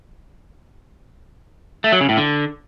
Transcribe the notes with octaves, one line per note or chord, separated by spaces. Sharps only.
A3
F#3
C#3
A2
D3